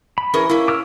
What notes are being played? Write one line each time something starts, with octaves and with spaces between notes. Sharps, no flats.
B5
E3 C#4 G#4 A#4
A#3 C#4 E4
D6 E6 F6